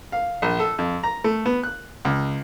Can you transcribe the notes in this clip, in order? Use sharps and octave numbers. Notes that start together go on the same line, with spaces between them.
F5
A#1
A4
F2
A#5
A3
B3
F#6
C#2